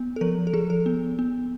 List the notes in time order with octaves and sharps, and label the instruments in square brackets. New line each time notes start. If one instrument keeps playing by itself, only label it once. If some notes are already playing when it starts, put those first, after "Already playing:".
Already playing: [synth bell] B3
A4
F3 A#4
A4
F3 G#4
A4
B3
B3